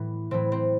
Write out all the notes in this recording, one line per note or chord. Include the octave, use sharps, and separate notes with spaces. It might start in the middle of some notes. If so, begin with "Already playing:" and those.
Already playing: A2 E3 B3
A2 E3 C4
C4